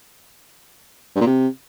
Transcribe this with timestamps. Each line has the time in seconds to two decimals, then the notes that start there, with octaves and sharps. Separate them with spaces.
1.16 G2
1.21 A#2
1.27 C3